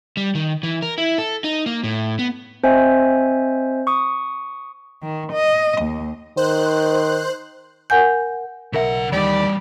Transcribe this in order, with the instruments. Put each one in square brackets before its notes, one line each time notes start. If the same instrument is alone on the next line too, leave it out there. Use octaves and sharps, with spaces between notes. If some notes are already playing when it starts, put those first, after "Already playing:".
[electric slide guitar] G3
D#3
E3
A#4
E4
A4
D#4
A#3
A2
B3
[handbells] C4 C5 D#5 E5 G#5
C#6 D#6
[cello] D#3
D#5
D#2
[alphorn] D#3 [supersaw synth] C5 F#6
[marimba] A#4 F#5 G#5 G6
[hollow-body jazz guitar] B1 A#4 E5 [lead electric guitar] C#3 F#5
[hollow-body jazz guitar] D#2 D#3 [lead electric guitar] E3 G3 [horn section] G4 D5 B5